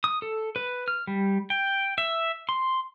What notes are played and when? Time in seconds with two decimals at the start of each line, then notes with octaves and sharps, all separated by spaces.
0.04 D#6
0.22 A4
0.56 B4
0.88 F6
1.07 G3
1.50 G5
1.98 E5
2.49 C6